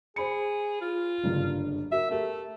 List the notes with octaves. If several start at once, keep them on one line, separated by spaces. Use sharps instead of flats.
G#4 C5 B5 C#7
F4
F#1 G2 D3
F#4 A#4 E5
A3 G4 A#4